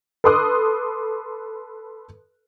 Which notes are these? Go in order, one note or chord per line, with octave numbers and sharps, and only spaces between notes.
A4 B4 C6 D6 D#6 F#6